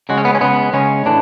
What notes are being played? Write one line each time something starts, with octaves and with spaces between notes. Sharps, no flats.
C#3 G#3 F#4
C#4
B3
C#4
C#3 G#3 B3
C#3 G#3 C#4
A2 E3 D4